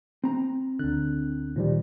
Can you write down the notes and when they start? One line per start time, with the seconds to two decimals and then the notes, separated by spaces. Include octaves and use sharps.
0.24 C4 A#5
0.79 D2 D3 F#6
1.56 A#2 D#3 F3 G3